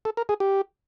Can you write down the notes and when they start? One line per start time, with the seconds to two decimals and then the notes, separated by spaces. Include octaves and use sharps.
0.05 A4
0.17 A#4
0.29 G#4
0.40 G4